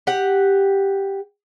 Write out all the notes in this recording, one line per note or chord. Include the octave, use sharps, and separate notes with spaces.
G4 F#5